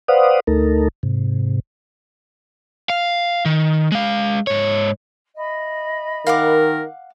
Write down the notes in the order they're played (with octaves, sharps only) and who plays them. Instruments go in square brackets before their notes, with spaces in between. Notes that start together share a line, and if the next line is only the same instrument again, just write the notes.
[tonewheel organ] B4 C5 D5 F5 F#5 D#6
D2 A3 D#4 A4 A#4
G#2 C3
[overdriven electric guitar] F5
D#3
G#3 F5
G#2 C#5
[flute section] D#5 E5 B5
[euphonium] D#3 [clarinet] A#4 [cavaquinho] F5 F#5 D6